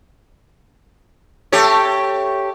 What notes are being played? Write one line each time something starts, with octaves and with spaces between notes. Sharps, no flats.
A3 G4 C#5